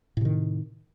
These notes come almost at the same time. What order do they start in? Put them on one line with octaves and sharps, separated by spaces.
A2 C3 D#3